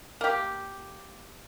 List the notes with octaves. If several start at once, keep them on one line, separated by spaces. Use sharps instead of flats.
A#3 G4